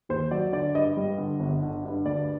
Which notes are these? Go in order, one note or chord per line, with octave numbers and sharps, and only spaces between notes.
D#2 C5
F#3 D5
D3 D5
G2 D#5
G3
D3
G1
D3
G2
D2 D5